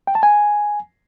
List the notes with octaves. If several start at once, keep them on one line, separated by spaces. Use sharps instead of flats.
G5
A5
G#5